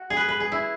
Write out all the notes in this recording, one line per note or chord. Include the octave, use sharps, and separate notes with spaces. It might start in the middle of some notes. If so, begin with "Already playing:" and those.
Already playing: F#4
G#4
B4
B4
G#4
E4